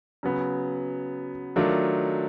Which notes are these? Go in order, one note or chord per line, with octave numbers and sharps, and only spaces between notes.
C#3 F#3 B3
D#3 F#3 A3 D4 F4